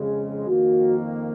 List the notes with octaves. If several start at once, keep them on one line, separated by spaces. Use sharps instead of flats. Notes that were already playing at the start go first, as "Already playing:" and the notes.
Already playing: F2 C#3 G#3 G#4
F2 D#3 A#3 F#4